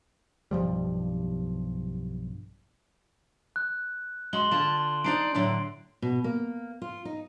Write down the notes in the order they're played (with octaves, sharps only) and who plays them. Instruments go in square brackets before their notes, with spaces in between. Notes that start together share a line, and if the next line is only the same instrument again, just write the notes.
[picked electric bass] B1 G2 F3 G3
[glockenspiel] F#6
[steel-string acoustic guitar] G#3 F#4 [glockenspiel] C6 F#7 G7
[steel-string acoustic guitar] D3 F4 A5
[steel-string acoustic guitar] D4 D#4 D5 [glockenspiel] C7 D7
[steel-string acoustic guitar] A2 D3 F#3
B2
A#3
F4
D#4